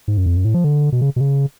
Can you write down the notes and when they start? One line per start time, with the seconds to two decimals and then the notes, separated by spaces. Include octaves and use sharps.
0.08 G#2
0.18 F#2
0.26 F2
0.37 F#2
0.45 A2
0.54 F3
0.64 D3
0.92 B2
1.01 C#3
1.16 B2
1.21 C#3